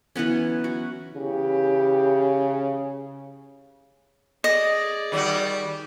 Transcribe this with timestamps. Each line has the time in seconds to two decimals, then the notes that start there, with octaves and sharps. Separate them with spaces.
0.16 E3 F#3 B3 C#4
0.64 F#4
1.15 C#3 E3 E4 G4
4.44 G#4 D5 D#5
5.12 D#3 G3 F#4